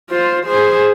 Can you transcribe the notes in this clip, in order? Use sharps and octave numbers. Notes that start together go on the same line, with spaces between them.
F4 C5
G#4 C5